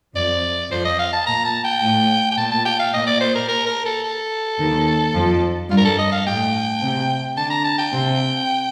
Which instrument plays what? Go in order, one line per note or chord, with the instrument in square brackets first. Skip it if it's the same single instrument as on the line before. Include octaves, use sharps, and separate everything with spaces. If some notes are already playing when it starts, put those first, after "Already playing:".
[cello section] F2 F3 [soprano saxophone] D5
[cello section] F2 F3 [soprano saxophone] C5
[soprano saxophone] D#5
F5
A5
[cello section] A#2 [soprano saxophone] A#5
[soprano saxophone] A5
G5
[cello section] A2
[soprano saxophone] G5
[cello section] A#2 [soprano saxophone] A5
[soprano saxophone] A5
G5
F5
[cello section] A#2 [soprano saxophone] D#5
[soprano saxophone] D5
C5
A#4
A#4
A#4
A4
A4
[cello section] D#2 D#3
F2 F3
[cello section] G2 G3 [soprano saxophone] F4
[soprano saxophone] A#4
A4
D#5
F5
[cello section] A2 A3 [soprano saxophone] G5
[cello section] C3 C4
[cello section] D3 D4 [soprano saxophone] A5
[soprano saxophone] A#5
A5
G5
[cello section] C3 C4